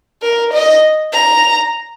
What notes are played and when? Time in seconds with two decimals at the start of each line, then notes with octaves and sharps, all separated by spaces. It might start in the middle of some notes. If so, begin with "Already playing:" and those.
0.23 A#4
0.53 D#5
1.13 A#5